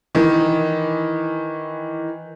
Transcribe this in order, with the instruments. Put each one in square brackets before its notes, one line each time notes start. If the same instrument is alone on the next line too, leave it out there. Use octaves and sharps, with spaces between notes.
[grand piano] D#3 E3